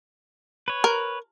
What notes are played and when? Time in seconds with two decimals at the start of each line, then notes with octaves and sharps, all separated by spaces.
0.68 B4 C#5
0.84 A#4